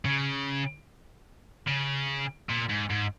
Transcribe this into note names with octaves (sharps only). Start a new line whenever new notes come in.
C#3
C#3
A#2
G#2
G#2